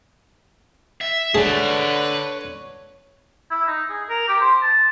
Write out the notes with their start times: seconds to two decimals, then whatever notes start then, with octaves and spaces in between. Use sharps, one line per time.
1.01 E5
1.35 D3 G#4 B4 C#5 A5
3.51 E4
3.67 D#4
3.89 G#4
4.09 A#4
4.28 G4
4.41 C5
4.62 A5